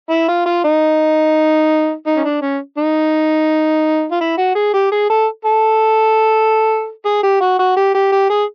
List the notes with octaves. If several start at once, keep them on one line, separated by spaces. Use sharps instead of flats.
E4
F4
F4
D#4
D#4
C#4
D4
C#4
D#4
F4
E4
F#4
G#4
G4
G#4
A4
A4
G#4
G4
F#4
F#4
G4
G4
G4
G#4